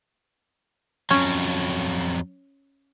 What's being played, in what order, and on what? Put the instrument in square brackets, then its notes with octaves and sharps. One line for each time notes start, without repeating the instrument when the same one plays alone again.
[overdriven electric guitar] F2 F#3 [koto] C#4